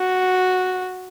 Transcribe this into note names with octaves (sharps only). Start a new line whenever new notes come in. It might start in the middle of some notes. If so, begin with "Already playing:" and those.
Already playing: F#4